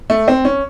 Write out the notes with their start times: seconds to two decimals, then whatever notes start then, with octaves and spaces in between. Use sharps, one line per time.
0.10 A3
0.28 C4
0.45 C#4